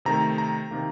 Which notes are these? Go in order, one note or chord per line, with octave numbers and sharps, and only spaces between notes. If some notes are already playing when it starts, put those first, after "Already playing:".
C3 D#3 A3 A#5
A#5
C3 D#3 A#3